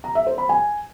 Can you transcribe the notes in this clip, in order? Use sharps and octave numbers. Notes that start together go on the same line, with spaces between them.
A#5
E5
C5
B5
G#5